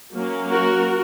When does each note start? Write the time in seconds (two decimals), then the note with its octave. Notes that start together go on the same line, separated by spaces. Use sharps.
0.14 F#3 A#3 C#4
0.50 F#4 A#4